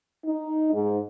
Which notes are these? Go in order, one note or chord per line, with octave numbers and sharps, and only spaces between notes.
D#4
G#2